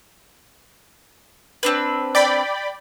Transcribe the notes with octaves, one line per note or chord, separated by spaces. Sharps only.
C4 D4 B4
D5 G5 B5